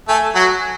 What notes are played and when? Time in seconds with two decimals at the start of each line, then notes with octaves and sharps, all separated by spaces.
0.08 A3 A4 G#5
0.35 F#3 F#4